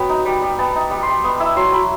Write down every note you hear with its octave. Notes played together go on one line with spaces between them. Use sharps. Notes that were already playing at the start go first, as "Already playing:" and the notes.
Already playing: F#3 B3 G5
D#4
G3
G3
B3 A5
D#4
G3
C6
G3
B3 D#6
E4 E6
F#3 C6
F#3 B5